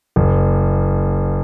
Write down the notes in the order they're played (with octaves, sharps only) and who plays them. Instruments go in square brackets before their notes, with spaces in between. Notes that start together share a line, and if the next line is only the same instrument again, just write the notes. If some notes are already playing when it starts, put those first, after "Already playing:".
[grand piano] F#1